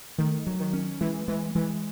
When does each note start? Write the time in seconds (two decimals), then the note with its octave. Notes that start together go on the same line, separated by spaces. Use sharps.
0.18 D#3 A3
0.47 F#3
0.60 D#3
0.73 C#4
1.01 E3 G#3
1.28 E3 G#3
1.55 E3 G#3